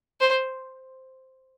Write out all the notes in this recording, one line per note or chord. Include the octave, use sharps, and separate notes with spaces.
C5